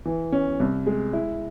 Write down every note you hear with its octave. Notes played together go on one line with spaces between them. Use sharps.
E3
C#4
C2
G#3
E4